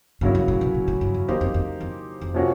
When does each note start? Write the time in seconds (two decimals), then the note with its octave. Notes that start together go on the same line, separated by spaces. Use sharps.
0.21 G2 C#3 F#3 A#3 C#4 E4
0.35 G2
0.48 A2
0.61 B2
0.74 A#2
0.88 A2
1.01 G2
1.14 F#2
1.28 E2 A#3 D#4 G4 C5
1.41 F2
1.54 F2
1.81 F2
2.21 F2
2.34 C3 F3 A#3 C#4 F#4